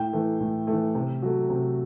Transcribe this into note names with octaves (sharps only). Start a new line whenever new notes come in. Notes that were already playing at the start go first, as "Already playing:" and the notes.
Already playing: A2 G5
E3 A3
A2
E3 A3
C3
F#3 A3
C3